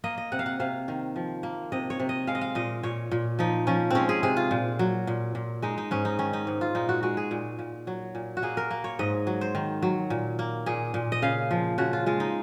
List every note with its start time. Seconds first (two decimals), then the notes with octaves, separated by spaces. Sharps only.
0.04 A#3 D#5
0.18 D#5
0.32 C3 F#5
0.39 F5
0.46 F#5
0.60 C3 F5
0.88 D#3
1.16 F3
1.43 A#3
1.72 C3 D#5
1.90 C#5
2.00 C3
2.09 D#5
2.27 G#3 F5
2.35 D#5
2.41 F5
2.55 A#2 D#5
2.83 A#2 C#5
3.11 A#2
3.39 F3 D#4
3.67 F3 C#4
3.90 G#3 C4 C#4
4.09 G#4
4.23 C3 G#4
4.37 F4
4.51 A#2
4.79 F#3
5.07 A#2
5.35 A#2
5.62 G#3 D#4
5.78 D#4
5.91 G#2 C#4
6.05 D#4
6.19 D#3 C#4
6.33 D#4
6.47 G#2
6.61 F4
6.75 A#2 D#4
6.89 F#4
7.03 G#3 F#4
7.17 G#4
7.31 A#2
7.59 A#2
7.87 F#3
8.15 A#2
8.37 F#4
8.42 A#3 G#4
8.57 A#4
8.71 A#3
8.84 C#5
8.99 G#2 D#5
9.27 F#3
9.41 C5
9.55 D#3
9.82 F#3
10.10 A#2
10.39 A#3
10.66 A#2 G#4
10.94 A#2
11.12 D#5
11.22 C#3 F5
11.51 F3
11.78 C#3 F#4
11.93 F4
12.06 G#3 F4
12.20 D#4